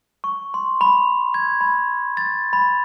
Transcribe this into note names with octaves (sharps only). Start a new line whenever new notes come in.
C#6
C6
B5
G#6
B5
A6
B5